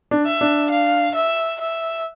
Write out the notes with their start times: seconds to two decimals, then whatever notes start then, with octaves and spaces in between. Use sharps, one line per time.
0.11 D4
0.26 E5
0.41 D4
0.70 F5
1.15 E5
1.61 E5